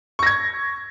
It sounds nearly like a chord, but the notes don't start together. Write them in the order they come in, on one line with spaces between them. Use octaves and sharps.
C#6 A#6 G#6